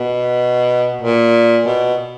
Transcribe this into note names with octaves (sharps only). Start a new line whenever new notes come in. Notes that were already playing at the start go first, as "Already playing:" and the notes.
Already playing: B2
A#2
B2